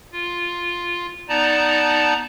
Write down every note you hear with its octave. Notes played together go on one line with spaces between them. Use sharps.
F4
B3 D#4 D5 A5 A#5